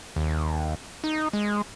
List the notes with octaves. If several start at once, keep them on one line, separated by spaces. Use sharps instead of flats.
D#2
D#4
G#3